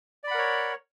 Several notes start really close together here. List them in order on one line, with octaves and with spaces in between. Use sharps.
D5 B5 F#5 A#4 C#5